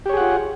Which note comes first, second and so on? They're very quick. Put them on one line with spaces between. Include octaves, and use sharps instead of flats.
G4 C#5 G#4 F#5 F4